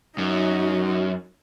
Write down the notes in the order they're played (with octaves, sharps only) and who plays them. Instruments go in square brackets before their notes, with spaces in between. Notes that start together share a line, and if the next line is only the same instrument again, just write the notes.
[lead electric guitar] F#2 [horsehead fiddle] D#4 F#4